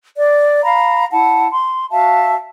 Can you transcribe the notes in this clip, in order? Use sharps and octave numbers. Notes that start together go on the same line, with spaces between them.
D5
F5 A#5 B5
E4 F#5 A5
C6
F#4 E5 F5 A5